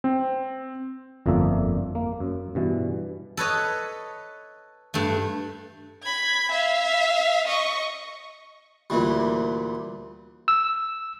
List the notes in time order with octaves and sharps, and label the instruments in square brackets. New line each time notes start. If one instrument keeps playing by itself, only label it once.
[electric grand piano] C4
[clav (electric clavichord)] G1 F2 A3 A#3 D4 E5
A#3
F#2
G2 B2 E3
[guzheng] A4 B4 C#5 D#5
G2 A3
[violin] B5 G#6
E5 F5
D#5 C#6
[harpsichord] D2 A#2 E3 G3
[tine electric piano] E6